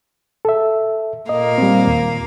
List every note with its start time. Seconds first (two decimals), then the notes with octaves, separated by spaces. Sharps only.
0.45 A4 E5
1.29 A#2 A#3 D#5 F5
1.58 G3 C4
1.87 D#2